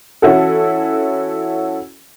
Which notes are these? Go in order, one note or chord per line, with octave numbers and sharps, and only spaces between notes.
E3 C#4 E4 F#4 A4